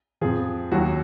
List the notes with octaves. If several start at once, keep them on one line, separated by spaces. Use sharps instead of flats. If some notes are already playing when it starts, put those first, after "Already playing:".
F2 F3 G#4
D#2 D#3 F#3 F#4